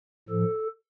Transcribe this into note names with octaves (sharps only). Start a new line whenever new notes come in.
A2 F3 A4